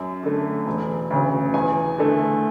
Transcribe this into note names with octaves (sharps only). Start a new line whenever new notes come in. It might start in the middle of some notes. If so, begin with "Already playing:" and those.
Already playing: F#2
D3 A3
E1
D2 C#3
E2 G#5
D3 A3